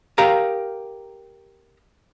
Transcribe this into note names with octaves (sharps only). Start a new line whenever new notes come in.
G4 A#4 F5 A#5